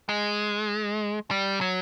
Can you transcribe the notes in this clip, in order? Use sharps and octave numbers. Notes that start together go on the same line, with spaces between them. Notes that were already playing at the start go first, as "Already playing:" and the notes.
G#3
G3
F#3